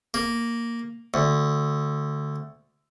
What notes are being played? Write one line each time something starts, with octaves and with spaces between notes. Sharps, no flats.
A#3
D2